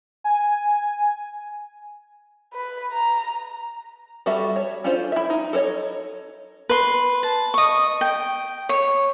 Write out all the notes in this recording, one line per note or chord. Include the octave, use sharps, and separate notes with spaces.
G#5
B4
A#5
G3 F#4 A4 E5
C#5
C#4 D4 F4 A4 C5
E4 E5
D#4
A4 A#4 C5 C#5 D#5
B4 C6
A5
D#5 C#6
G5
C#5